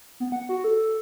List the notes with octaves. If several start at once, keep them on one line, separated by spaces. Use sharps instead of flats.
B3
F#5
F#4
A4